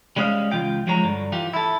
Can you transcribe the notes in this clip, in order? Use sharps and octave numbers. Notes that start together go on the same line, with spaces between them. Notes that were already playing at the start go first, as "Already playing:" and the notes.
G3 G#3 C#4 C#5 D#5 F5
C#2 A#2 E3 F4 G5
F3 F#3 G#3 C#5 A#5
G2 D3
E3 F4 G4
E4 A4